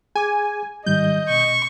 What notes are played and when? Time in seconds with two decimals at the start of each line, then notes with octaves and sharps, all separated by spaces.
0.16 G#4 G#5 D6
0.86 G#2 D#3 G3 D#5 G6
1.29 B2 C#6